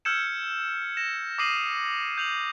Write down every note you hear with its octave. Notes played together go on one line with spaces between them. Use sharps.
E6 F6 G6 G#6 C#7 E7
A#6 E7
D6 D#6 A#6 C7 D#7 F#7
G6 F7 F#7